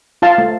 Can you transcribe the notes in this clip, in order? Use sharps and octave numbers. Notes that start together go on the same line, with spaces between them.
F4 F5 A5
A3